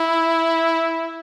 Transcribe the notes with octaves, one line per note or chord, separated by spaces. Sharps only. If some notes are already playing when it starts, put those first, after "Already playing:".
Already playing: E4